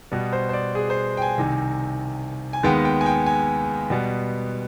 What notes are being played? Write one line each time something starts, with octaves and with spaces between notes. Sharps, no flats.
B2 G3 B3
C5
C5
D5
G#4
C5
G5
G#5
C2 C3 D#3
G#5
D#2 D#3 G#3 B3 G5
G5
G#5
G5
G#5
B2 G3 B3